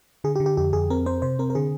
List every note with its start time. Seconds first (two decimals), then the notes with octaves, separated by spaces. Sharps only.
0.24 D3 G#4
0.35 G4
0.40 D3
0.46 G4
0.57 F2 G4
0.73 F2 G#4
0.90 C4 A#4
1.06 C4 C5
1.22 C3 C5
1.39 C4 A#4
1.50 A#4
1.55 D3 G#4